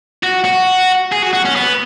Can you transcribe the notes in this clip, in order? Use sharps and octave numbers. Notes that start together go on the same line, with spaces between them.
F#4
F#4
G#4
F#4
F#4
C#4
B3